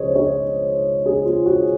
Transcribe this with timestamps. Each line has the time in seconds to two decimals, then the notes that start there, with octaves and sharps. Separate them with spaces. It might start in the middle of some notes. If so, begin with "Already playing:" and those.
Already playing: C#2 C#3 F3 G#4 C5 C#5 D#5
0.15 C#5
1.06 G#4
1.25 F4
1.46 F#4